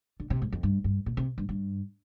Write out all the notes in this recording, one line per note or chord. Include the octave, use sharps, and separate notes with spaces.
D3
C3
G#2
F2
G2
G2
A#2
C3
G2
G2